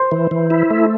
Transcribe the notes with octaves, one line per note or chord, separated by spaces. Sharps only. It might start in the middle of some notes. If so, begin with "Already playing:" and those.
Already playing: C5 C6
E3
E3
E4
A3